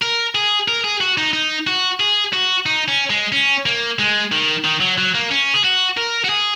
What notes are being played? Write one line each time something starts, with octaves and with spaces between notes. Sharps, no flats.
A#4
G#4
A#4
G#4
F#4
D#4
D#4
F#4
G#4
F#4
D#4
C#4
G#3
C#4
A#3
G#3
D#3
D#3
F#3
F#3
A#3
C#4
G#4
F#4
A#4
F#4
G#4